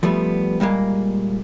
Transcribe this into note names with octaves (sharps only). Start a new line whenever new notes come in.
F3 G3 A3 B3
A#2 G3 G#3 A#3